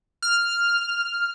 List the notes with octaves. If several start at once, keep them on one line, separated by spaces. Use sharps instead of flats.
F6